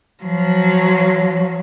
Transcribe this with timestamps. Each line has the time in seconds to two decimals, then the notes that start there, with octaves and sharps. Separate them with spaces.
0.24 F3 F#3